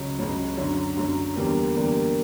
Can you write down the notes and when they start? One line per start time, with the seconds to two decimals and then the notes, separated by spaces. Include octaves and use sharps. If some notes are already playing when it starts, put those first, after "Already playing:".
Already playing: C#2 C#3 F#3
0.19 C#2 C#3 F#3
0.57 F#2 D3 F#3
0.97 F#2 D3 F#3
1.36 E2 D3 G3 A#3
1.75 E2 D3 G3 A#3